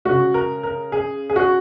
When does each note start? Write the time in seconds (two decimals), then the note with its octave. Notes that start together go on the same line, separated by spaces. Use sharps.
0.05 C#3 G#3 F#4
0.34 A#4
0.63 A#4
0.92 G#4
1.30 G#4
1.36 F#4